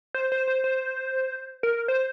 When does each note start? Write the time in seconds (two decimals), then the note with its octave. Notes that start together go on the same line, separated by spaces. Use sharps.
0.15 C5
0.32 C5
0.47 C5
0.64 C5
1.63 A#4
1.88 C5